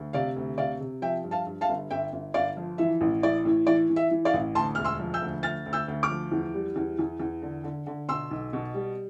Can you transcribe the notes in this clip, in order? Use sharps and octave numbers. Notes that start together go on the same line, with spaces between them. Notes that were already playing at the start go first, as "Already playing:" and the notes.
Already playing: D2
C3 D5 F5
D2
C3 D5 F5
C3
F3 E5 G5
G2
F5 A5
G2
F5 A5
G1
G1 E5 G5
G1
G1 D5 F5
F3
E3 E5
A1
E3 D5
A2
E3 D5
E3
E5
E3
D5 F5
A1
D2 A5 C6
E1 F6
C6 E6
F3
E6 G6
D2
D2 F6 A6
D2
E6 G6
D2
D6 F6
F3
E2
G3
E2
E2
E2
D3
D3
D3
B2 C6 E6
B1
B2
G3